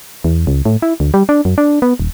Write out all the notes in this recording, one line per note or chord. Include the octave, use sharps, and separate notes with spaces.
E2
C#2
A2
E4
D2
G3
D4
F#2
D4
B3
D#1